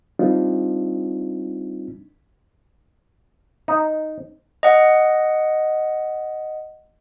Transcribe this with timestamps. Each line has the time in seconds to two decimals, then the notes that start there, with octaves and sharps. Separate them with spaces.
0.19 G3 C4 D4 D#4 F4
3.68 D#4
4.63 D#5 F#5